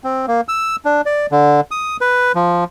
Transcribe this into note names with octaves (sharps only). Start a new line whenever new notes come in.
C4
A#3
E6
D4
D5
D3
D#6
B4
F3